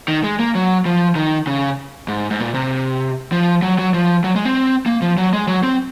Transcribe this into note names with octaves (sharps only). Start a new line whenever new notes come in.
D#3
G#3
A#3
F#3
F3
D#3
C#3
G#2
G#2
A#2
C3
F3
F#3
F#3
F3
F#3
G#3
C4
A#3
F3
F#3
G#3
F#3
C4